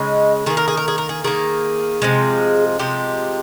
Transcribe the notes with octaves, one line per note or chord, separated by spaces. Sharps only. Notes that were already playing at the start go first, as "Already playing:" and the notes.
Already playing: C#3 G#3 D#4
D#3 A#3 G#4
A#4
G#4
A#4
G#4
A#4
G#4
D#3 A#3 G#4
C3 F3 G#3
C3 F3 G#3 G4